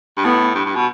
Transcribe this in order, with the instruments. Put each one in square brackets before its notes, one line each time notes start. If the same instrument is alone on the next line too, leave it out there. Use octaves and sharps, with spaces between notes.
[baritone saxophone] G2
[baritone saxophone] A2 [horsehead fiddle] B3
[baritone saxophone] G2
G2
B2